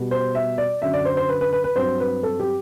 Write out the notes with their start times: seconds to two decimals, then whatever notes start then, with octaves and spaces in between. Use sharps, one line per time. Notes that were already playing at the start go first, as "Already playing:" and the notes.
Already playing: B2 G3 B3
0.11 C5
0.35 E5
0.58 D5
0.82 F#2 D3 F#3 E5
0.94 D5
1.05 C5
1.17 C5
1.29 B4
1.41 B4
1.53 B4
1.64 B4
1.76 G2 F#3 C4 C5
2.00 B4
2.23 A4
2.40 G4